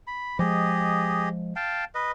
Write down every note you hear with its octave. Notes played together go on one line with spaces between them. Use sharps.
B5
F3 G#3 G4 G#4 D#5
F5 G5 A5
B4 D#5